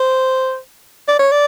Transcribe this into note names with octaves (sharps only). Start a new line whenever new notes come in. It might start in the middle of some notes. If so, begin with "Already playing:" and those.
Already playing: C5
D5
C#5
D5